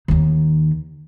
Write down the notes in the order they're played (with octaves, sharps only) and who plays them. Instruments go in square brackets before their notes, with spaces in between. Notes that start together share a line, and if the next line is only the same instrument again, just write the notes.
[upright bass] D#2 D#3